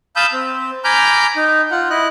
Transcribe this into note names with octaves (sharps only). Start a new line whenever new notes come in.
F5 A5 B5 D#6 E6 G6
C4
G#5 A#5 B5 D6 F6 G6
D#4
F4 F#5
E4 D#5 F#6